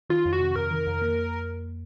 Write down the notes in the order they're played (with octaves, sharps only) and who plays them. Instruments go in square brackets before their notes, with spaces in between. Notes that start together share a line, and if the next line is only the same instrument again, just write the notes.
[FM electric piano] D#3 [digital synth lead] F4
[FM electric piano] F2
[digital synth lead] F#4
[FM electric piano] C3
[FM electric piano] F2 [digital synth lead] A#4
[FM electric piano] D#3
F2
A#3